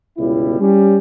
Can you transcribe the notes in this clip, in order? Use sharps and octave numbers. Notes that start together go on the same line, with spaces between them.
G1 C#2 B2 G3 E4
G3 C#4